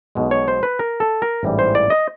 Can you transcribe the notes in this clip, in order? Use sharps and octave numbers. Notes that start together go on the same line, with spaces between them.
B1 B2 G#3
C#5
C5
B4
A#4
A4
A#4
A1 G#2 E3 G3
C5
D5
D#5